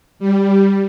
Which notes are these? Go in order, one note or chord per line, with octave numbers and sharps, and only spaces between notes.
G3